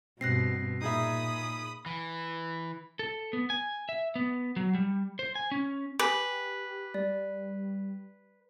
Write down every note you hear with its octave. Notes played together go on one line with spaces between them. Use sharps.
G2 B2 C4 F#6 A#6 C7
A#2 D#4 G#4 E5 B5 D#6
E3
A4
B3
G#5
E5
B3
F#3
G3
C5
G#5
C#4
G4 B4 G#5 D6
G3 D5